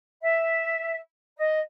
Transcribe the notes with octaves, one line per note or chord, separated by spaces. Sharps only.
E5
D#5